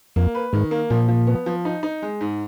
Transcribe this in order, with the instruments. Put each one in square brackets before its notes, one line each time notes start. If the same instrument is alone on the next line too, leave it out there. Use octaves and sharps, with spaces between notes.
[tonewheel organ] F2 [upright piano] A#3
[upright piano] B4
[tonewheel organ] G#2 [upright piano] D#3
[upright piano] A#3
[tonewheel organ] A#2 [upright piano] F3
[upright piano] F3
B3
F3
D#4
D#4
G#3
G#2